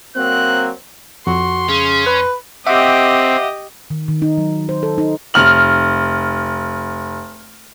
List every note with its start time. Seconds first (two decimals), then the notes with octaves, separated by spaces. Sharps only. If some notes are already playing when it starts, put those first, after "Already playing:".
0.16 F#3 A#3 C4 F#6
1.27 F2 F#4 C6
1.69 C#3 C#4
2.06 B4
2.67 C4 G4 D#5 E5 F#5 D6
3.90 D#3
4.08 D#3
4.22 D#4
4.38 F#3
4.69 C5
4.83 A4
4.98 D#4
5.34 F1 F6 F#7